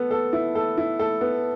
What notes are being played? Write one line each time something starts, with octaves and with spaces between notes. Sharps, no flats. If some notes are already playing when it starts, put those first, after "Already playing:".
Already playing: B3 A4
A4
E4
A4
E4
A4
B3